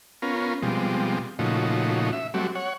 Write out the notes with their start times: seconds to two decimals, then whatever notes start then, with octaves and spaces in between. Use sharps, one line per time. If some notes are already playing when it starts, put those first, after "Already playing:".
0.22 B3 C#4 F4 A#4
0.63 B2 F3 G3 G#3 C4
1.39 A#2 C#3 F3 A3 D#4 F#4
2.13 E5
2.34 F#3 G3 A3 C4 F#4
2.55 C#5 F#5